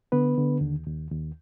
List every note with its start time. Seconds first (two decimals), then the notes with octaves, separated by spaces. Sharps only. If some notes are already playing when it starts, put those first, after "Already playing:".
0.12 D3 B3 B4
0.37 D3
0.61 D#2
0.87 D#2
1.11 D#2